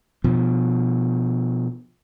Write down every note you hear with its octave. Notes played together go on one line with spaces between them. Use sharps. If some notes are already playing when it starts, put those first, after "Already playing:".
B2 F3